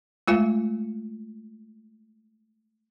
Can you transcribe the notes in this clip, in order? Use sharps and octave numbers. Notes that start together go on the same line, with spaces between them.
G#3 A3 F4 G#5